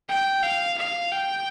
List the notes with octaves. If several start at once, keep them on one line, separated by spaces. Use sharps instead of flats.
G5
F5
F5
G5